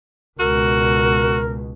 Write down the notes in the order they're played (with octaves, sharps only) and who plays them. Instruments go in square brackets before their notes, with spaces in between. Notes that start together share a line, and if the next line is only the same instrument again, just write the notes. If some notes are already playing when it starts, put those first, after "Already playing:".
[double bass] C#2 B2 [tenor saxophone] F#4 [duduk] A#4